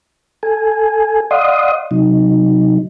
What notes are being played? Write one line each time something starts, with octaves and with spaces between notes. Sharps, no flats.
A4 G#5
D5 D#5 F5 F#5 C6 D#6
C3 F#3 D#4